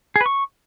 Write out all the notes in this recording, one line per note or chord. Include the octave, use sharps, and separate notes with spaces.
G#4
B4
C#6